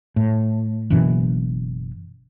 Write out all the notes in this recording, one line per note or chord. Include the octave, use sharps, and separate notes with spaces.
A2
F#1 F#2 B2 E3